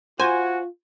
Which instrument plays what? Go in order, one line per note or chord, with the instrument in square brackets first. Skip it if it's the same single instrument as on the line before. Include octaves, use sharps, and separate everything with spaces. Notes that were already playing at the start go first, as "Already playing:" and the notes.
[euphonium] F4 [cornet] F#4 [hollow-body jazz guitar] C5 [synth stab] G#5